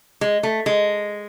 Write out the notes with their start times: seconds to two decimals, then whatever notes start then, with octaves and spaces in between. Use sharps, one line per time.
0.21 G#3
0.43 A3
0.66 G#3